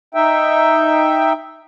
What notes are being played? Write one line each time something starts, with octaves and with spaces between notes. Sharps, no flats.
D#4 E5 G5